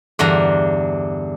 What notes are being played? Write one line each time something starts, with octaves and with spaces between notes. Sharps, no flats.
E2 G2 D3 A#5